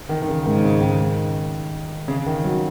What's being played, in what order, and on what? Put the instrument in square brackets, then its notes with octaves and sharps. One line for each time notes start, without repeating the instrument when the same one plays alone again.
[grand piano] D#3
D#3
C#3
[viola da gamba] G#2 [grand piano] D#3
[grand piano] C#3
D#3
C#3
D#3
F#3